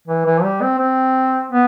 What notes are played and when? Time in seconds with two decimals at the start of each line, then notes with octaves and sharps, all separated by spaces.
0.08 E3
0.26 E3
0.43 G3
0.62 C4
0.79 C4
1.51 B3